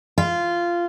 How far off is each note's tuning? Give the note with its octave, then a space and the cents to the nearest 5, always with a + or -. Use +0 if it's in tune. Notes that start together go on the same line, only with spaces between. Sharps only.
F4 -15